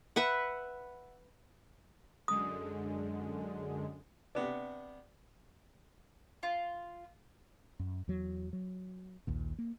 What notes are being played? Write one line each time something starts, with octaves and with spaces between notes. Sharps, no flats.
B4 E5 F#5
F#2 D3 G#3 D#6
C3 B3 D4
F4
F#2
E2 F#3
F#3
A#1 D#2 A#2
A#3